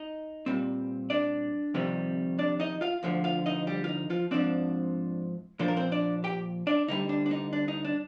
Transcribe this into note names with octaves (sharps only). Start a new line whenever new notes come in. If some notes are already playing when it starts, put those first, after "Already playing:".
Already playing: D#4 D#5
A#2 G3 C4
D4 D5
F2 C3 D#3 G3
D4 D5
D#4 D#5
F4 F5
D2 D3 F3
F4 F5
D#4 D#5
G3 G4
F4
D#4
F3 F4
G#2 F3 C4 D4 D5
A#2 F3 A#3 D4 C5
A#4
C4 C5
D4 D5
G4 G5
D4 D5
D2 D3 G3 D#4
D4
D4
D#4
D4
D#4
D4